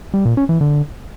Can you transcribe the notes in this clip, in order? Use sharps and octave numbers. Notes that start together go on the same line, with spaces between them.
G3
A#2
C#4
E3
D3